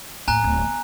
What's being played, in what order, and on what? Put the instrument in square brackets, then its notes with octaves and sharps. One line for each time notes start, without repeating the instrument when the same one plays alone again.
[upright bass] D#2 A2 [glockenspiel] G#5 A#5 F#6
[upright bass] D1 F#3
B3